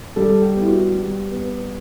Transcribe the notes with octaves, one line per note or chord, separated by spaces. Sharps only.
G3 A4
G4
B3
E4
F#4
G3 G4
B3